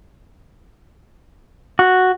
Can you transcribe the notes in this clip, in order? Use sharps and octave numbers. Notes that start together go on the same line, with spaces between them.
F#4